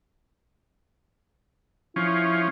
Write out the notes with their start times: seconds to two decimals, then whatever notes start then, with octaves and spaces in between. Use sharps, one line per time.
1.96 F3 C#4 E4